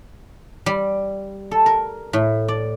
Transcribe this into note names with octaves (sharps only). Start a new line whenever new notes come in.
G3
A4
A#4
A2
D5